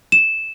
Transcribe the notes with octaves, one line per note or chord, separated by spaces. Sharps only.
E7